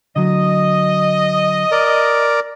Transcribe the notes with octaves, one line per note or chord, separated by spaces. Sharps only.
D3 F#3 D#5
A#4 D5